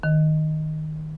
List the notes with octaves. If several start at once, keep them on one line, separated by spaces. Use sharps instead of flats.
D#3